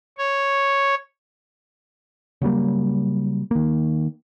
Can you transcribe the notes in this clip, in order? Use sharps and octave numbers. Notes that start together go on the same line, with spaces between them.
C#5
C#3 F#3 G3 A#3
D#3 A#3